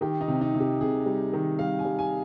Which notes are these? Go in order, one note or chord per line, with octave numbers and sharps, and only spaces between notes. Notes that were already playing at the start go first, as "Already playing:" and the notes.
D#3 G4
D#4
C3
D#4
C3
G4
C3 G#4
G3
D#3
G3 F5
G#5
G3
G#5